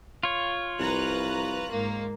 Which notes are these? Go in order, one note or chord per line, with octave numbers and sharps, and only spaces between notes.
F4 C#5
C2 B4 A#5 F#6
G#2 A#3